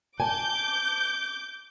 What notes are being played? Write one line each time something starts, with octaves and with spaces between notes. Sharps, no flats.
G#5 A5 D6 G6